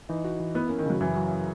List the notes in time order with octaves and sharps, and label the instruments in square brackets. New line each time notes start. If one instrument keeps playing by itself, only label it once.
[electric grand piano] E3 [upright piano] D#4
[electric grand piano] F#4
E3
[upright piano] B3 [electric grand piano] E4
[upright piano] A#3 [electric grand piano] C#4
[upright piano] D#3
[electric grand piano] C#3 [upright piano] F#3
[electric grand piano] F#2 [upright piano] E3
[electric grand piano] F#3